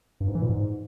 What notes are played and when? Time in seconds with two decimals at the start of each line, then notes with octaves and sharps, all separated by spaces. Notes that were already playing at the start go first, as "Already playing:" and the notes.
0.20 G2
0.28 G#2
0.35 E3
0.42 A#2
0.49 G#2